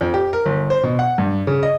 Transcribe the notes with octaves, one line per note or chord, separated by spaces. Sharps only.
F2
G4
A#4
G1
C5
B2
F#5
G2
C#3
D#5